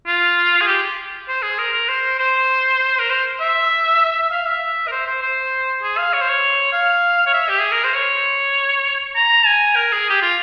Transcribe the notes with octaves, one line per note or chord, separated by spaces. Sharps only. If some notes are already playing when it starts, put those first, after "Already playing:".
F4
G#4
G4
C5
G#4
A#4
A#4
C5
C5
A#4
C5
E5
F5
E5
A#4
C5
C5
C5
G#4
F5
C#5
C5
C#5
F5
C#5
E5
G4
G#4
A#4
C5
C#5
A#5
G#5
A#4
G#4
G4
F4